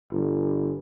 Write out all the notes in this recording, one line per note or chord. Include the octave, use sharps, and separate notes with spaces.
G1